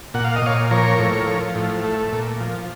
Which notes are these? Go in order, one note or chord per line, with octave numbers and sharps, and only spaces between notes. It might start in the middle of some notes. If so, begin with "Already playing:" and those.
A#2 F#5
F5
D#5
A#2 C#5 F5
F3 A#4 C#5
A2
F3
A2
A3
A#2
F3